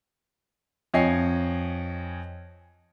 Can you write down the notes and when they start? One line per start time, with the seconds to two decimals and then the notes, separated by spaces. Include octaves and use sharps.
0.94 F2 C#5 D#5 G#5 C7